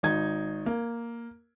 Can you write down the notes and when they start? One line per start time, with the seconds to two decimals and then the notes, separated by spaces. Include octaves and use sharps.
0.03 G#1 D#4 G#6
0.66 A#3